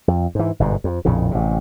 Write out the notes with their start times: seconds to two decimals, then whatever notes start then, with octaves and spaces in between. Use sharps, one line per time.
0.08 F2
0.35 G#2 E3
0.60 G1 G#2 B2
0.84 F2
1.05 A#1 F2 A2 C#3
1.31 A1 C3